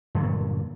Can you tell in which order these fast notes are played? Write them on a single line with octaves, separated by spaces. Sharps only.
G2 D3 F#3 A#2